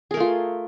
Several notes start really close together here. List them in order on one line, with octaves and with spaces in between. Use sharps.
G#4 A#4 A3 F4